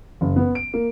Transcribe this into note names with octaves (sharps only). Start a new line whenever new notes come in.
F#1
B3
D7
A#3